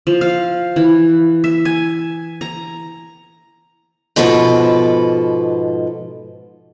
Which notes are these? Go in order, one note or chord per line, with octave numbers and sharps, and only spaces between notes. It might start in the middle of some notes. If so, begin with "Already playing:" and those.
F3
F5
E3
E5
G#5
A#5
G#2 B2 F3 A4 B4